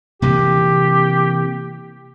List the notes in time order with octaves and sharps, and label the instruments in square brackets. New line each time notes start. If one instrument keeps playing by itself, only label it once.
[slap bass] C3 E3 A#3 [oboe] G4